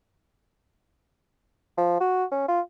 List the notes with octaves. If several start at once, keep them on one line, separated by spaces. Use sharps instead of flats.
F3
F#4
C#4
F4